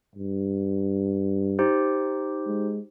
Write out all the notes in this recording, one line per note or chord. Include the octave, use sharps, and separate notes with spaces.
G2
D#4 G4 C5
G#3